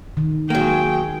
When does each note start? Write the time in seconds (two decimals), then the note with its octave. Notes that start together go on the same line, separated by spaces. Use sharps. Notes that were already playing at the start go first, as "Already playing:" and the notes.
0.17 D#3
0.50 F#3 G#3 A#3 G5